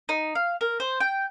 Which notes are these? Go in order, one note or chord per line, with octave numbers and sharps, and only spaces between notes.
D#4
F5
A#4
C5
G5